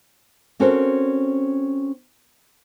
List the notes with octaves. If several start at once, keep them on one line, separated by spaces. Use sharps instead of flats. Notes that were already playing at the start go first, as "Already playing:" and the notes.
C4 C#4 F#4 A4 A#4 C5